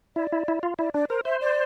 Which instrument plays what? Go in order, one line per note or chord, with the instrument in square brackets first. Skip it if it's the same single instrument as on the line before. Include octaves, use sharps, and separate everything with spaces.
[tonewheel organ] E4 [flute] D5
[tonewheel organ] E4
E4
F4
[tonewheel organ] E4 [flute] D5
[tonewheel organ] D4 [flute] D5
[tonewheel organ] A#4 [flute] C5
[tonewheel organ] C5 [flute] E5
[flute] D5